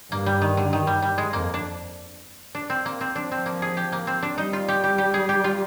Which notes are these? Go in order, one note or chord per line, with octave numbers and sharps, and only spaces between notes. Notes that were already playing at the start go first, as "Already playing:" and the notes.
G2 A#3
G3
D#3
D3
D#3
G3
G3
G#3
F2 A#3
D4
D4
C4
A#3
C4
F3 D4
C4
A#3
G#4
G4
A#3
C4
D4
G3 D#4
F4
G4
G4
G4
G#4
G4
F4